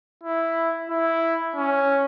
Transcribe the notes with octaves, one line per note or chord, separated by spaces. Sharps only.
E4
E4
C#4